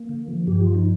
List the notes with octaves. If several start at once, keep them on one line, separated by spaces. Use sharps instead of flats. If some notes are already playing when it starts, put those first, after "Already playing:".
Already playing: A#3
D3
F3
G2 G4
F4
F3
D#4